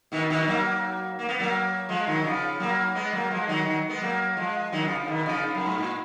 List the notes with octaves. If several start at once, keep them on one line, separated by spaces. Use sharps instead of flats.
B2 D#3
B2 D#3
F#3 A#3
A#3
B3
F#3 A#3
F3 G#3
D#3 F#3
C#3 F3
F#3 A#3
G#3 B3
F#3 A#3
F3 G#3
D#3 F#3
D#3 F#3
G#3 B3
F#3 A#3
F3 G#3
D#3 F#3
C#3 F3
C#3
B2 D#3
C#3 F3
C#3
F#2
G#2
A#2